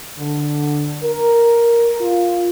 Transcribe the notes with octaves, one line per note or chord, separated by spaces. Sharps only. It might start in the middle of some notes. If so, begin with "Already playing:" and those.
D3
A#4
F4